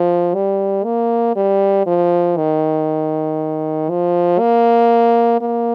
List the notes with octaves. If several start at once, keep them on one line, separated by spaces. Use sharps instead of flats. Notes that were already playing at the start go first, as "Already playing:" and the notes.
Already playing: F3
G3
A#3
G3
F3
D#3
F3
A#3
A#3